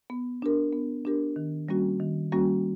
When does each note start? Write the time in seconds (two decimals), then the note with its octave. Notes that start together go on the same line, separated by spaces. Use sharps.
0.10 B3
0.42 D4 G4 A#4
0.73 B3
1.05 D4 G4 A#4
1.36 D#3
1.69 G3 A#3 C#4 F#4
2.00 D#3
2.32 G3 A#3 C#4 F#4